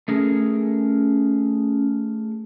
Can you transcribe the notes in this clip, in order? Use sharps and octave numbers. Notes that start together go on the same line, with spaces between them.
A3 C#4 G#4 A#4